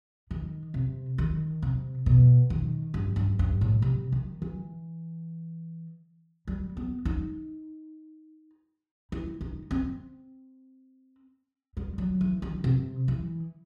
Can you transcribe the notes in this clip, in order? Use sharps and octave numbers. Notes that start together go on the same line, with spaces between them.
D#3
C3
D#3
C3
B2
D#3
G2
G2
G2
A2
C3
D#3
E3
G3
B3
D#4
E4
D#4
C4
G3
F#3
E3
D#3
C3
E3